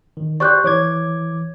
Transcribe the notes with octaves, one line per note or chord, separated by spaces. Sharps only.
D#3
G4 C5 D5 C#6 F#6 G6
E3 C#5 D6 G#6